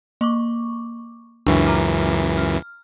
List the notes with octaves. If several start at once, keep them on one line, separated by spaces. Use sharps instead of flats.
A#3 C#6 D6
C#2 F#2 E3 D4 C#6
A#5 D6 F6
F6